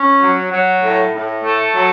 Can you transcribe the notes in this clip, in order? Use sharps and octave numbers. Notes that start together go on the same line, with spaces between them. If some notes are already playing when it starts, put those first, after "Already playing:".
Already playing: C#4
F#3
F#3
A2
A2
A3
F#3